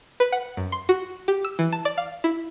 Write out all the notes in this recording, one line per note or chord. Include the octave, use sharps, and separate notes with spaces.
B4
F#5
F#2
C6
F#4
G4
E6
E3
A5
D5
F5
E4